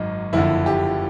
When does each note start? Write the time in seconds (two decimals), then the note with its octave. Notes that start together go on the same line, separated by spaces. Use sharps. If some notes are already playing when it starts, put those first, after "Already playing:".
Already playing: G#1 F#2 D#4
0.33 F#1 F2 D3 E4
0.66 G4